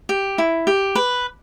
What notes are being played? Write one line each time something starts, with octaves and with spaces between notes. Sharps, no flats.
G4
E4
G4
B4